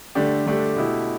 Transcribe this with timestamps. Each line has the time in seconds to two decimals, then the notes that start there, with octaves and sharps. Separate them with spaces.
0.15 D3 A3 D4 G4
0.46 D3 A3 D4 G4
0.76 B2 A3 E4 G4